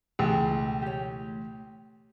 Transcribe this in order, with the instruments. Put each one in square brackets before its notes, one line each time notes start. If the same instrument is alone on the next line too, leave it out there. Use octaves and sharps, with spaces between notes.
[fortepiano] C#2 [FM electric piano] B2 E3 A3 [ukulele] G#4 G5
[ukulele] G4 C#5